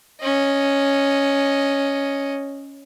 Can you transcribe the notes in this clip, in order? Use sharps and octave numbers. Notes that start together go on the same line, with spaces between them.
C#4 D#5